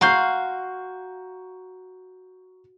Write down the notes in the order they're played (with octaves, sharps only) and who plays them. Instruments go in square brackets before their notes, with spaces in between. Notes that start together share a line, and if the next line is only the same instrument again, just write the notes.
[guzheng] F#4 F5 C6 [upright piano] A#5 C#6 G6